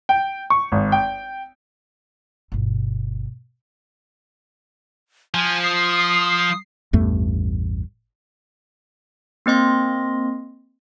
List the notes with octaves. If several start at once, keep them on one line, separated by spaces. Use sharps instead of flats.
G5
C#6
G#1
G5
G1 B2
F3 G#5
D#6 C7
A1 E2 G2 A3
A#3 C4 D#5 C6 A#6